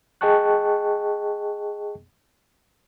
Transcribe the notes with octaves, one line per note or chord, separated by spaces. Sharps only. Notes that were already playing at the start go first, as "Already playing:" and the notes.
G#4 D#5 G5 A5 C#6 F#6